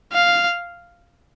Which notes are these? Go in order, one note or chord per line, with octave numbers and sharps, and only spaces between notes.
F5